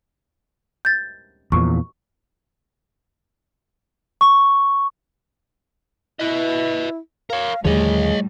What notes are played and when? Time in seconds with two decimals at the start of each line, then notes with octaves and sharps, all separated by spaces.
0.85 G6 A6
1.52 E2 A#2 F3 C#6
4.21 C#6
6.19 E4 B4 D#5
7.30 A#4 C#5 F5
7.65 D#2 A2 D3 F3 G3 G#4 C#5 D#5